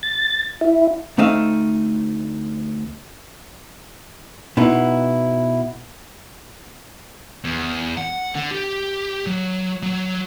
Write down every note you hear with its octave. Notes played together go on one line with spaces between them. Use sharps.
A6
E4
D2 A3 C4 D#4 E5 F5
B2 B3 D#4 E4
E2
F#5
D3
G4
F#3
F#3